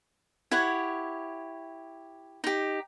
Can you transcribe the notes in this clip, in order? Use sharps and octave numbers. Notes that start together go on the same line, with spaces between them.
E4 G4 C#5 F#5
D#4 G4